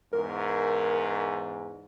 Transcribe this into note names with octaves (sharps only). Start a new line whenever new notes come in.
E2 G#2 A#4